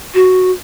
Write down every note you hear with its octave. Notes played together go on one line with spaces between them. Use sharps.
F#4